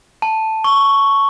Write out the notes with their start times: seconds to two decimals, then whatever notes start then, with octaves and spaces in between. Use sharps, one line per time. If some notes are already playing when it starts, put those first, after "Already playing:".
0.22 A5
0.64 C#6